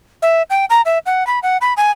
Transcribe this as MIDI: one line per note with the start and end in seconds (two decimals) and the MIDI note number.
0.22 0.42 76
0.50 0.65 79
0.70 0.81 82
0.85 0.98 76
1.06 1.26 78
1.27 1.39 83
1.43 1.57 78
1.61 1.73 83
1.77 1.91 80